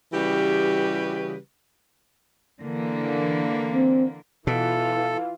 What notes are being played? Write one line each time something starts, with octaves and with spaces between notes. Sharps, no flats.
C#3 E3 G3 F#4 G4 B4
D3 E3 A#3
C4
B2 E3 E4 F4 A4 F5